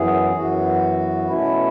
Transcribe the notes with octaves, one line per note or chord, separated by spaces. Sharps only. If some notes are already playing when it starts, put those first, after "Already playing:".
Already playing: F#2 E3 B3 G#4
F#2 E3 B3 F#4
B2 A3 C#4 E4